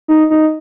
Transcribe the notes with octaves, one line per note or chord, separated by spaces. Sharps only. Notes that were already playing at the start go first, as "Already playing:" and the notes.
D#4
D#4